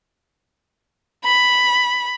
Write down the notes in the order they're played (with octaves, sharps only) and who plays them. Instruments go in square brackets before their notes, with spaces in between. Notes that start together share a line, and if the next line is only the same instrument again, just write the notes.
[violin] B5